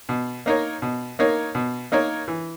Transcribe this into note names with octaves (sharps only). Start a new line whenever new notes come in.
B2
A#3 D#4 A#4 C#5
B2
A#3 D#4 A#4 C#5
B2
A#3 D#4 A#4 C#5
E3